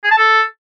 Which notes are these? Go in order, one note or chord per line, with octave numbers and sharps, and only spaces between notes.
G#4
A5
A4